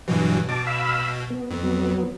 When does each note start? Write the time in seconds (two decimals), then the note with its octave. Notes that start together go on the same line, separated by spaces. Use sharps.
0.08 G2 B2 E3 F#3
0.49 B2 A5 D6
0.67 F5 B5 E6
1.30 B3
1.51 F2
1.63 F#3 B3